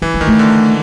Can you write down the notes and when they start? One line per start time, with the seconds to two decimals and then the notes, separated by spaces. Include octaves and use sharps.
0.02 E3 F#3
0.14 G3
0.21 D#3 A#3
0.27 A3
0.39 D3